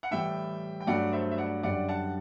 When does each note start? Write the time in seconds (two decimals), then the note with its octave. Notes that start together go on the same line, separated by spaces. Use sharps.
0.03 F#5
0.11 A2 E3 G3 E5 G5
0.80 G5
0.87 G2 F#3 A3 D5 F#5
1.13 C5 E5
1.31 E5
1.38 D5 F#5
1.63 F#2 D3 G3 D5 F#5
1.89 F#5 A5